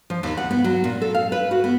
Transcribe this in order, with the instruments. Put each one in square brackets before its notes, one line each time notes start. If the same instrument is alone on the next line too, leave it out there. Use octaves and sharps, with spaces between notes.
[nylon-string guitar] F3
D#2
F#5
B3
F#3
A#2
A4
F5
B4
F#4
B3